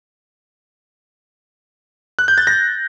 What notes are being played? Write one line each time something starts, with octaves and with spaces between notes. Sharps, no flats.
F#6
G6
A6
A#6